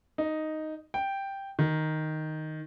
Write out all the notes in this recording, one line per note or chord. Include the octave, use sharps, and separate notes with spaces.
D#4
G5
D#3